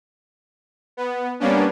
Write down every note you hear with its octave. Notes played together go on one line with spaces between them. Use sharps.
B3
G3 A#3 B3 C#4 D4